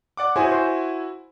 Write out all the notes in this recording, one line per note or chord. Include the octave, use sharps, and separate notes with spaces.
D5 F#5 D6
E4 F#4 G#4 C5 C#5 G#5
C5